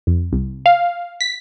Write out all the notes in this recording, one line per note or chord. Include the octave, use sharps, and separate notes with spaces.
F2
C2
F5
B6